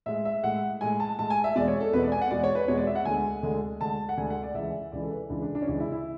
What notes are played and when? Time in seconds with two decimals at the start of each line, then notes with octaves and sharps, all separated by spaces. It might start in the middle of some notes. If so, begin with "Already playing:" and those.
0.06 A2 G#3 E5
0.25 E5
0.43 A2 G#3 F#5
0.81 A2 G#3 G#5
1.00 A5
1.19 A2 G#3 A5
1.30 G#5
1.44 E5
1.56 E2 B2 G#3 D5
1.68 C#5
1.81 A4
1.93 E2 B2 G#3 B4
2.03 D5
2.12 G#5
2.21 F#5
2.30 E2 B2 G#3 D5
2.44 C#5
2.55 B4
2.68 E2 B2 G#3 C#5
2.77 D5
2.87 E5
2.95 F#5
3.05 D2 D3 G#3 G#5
3.43 D2 D3 G#3
3.80 D2 D3 G#3 A5
4.09 F#5
4.17 D2 D3 G#3 G#5
4.30 F#5
4.43 D5
4.54 C#2 C#3 E3 E5
4.92 C#2 C#3 E3 D5
5.02 A4
5.11 B4
5.29 C#2 C#3 E3 D4
5.42 D4
5.55 D4
5.62 C#4
5.67 C#2 C#3 E3 D4
5.80 E4
5.92 E4